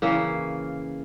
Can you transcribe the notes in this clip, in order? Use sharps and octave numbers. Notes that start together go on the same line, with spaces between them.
C#3 E3 A#3